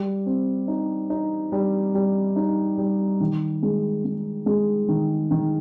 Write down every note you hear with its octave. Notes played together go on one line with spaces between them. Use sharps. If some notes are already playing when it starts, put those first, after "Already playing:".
Already playing: G3
C4
D#4
D#4
G3
G3
D#4
G3
D#3
G#3
G#3
G#3
D#3
D#3